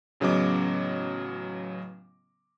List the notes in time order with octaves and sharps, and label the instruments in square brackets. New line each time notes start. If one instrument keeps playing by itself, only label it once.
[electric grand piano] A1 C#3 F#3 B3 D#5 D6